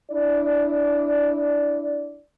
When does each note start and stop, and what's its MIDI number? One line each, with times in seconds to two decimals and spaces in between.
0.11 2.20 62
0.11 2.20 64
0.11 2.20 74